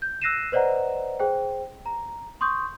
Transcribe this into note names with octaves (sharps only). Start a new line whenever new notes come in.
G6
E6 F#6 A#6 C7 D#7 E7
B4 C5 D5 D#5 F#5 A#5
G#4 C5 G5
A#5
C6 C#6 D#6 G6